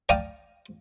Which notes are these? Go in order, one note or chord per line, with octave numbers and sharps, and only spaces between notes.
D5 F5 G5 A5 A#5 D#6